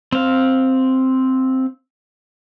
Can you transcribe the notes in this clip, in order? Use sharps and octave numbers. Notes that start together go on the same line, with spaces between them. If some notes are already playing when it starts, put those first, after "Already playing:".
C4 F5